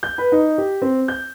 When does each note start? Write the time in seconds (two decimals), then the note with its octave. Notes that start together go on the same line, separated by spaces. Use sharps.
0.03 G6
0.18 B4
0.32 D#4
0.58 G4
0.82 C4
1.08 G6